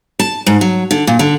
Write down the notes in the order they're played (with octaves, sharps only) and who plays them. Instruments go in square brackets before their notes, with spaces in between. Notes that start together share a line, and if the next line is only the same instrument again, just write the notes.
[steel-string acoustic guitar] A5
G#2
F#3
D3
A#2
D3